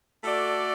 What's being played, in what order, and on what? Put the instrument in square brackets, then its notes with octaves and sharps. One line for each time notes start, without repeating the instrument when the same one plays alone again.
[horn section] A3 F#4 A4 D5